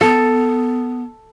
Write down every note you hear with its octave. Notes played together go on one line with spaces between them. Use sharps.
B3 A4